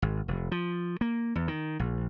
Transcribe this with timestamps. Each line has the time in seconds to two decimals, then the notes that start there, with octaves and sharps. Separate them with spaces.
0.02 G#1
0.28 F1
0.52 F3
1.01 A#3
1.35 E2
1.48 D#3
1.79 A#1